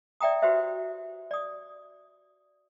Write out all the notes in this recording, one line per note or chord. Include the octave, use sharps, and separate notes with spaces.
D5 E5 G5 A#5 D#6
F#4 G4 B4 C5 E5
D5 D#6